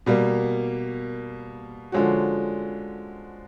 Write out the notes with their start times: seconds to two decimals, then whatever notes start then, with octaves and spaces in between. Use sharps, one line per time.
0.06 B2 G3 A#3
1.92 D3 F3 G#3 C#4 F#4